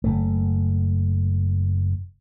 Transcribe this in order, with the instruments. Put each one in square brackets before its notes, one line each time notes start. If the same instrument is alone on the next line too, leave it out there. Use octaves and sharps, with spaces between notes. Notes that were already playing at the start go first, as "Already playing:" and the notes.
[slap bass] F#1 C#2 A3